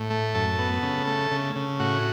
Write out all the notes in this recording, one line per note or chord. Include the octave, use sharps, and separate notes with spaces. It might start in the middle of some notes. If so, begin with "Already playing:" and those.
Already playing: A2
A3
F#2 A4
B3
C#3
A3
C#3
C#3
A2 F#4